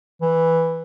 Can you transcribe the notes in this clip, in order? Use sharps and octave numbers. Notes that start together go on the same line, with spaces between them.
E3